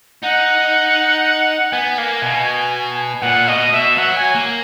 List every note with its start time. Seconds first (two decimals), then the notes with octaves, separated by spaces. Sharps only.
0.23 D#4 F#5
1.72 B3 G#5
1.98 A#3
2.22 B2
3.19 G#5
3.22 A#2 F#5
3.48 B2 D#5
3.72 B2 E5
3.97 F#3 F#5
4.17 G#5
4.35 A#3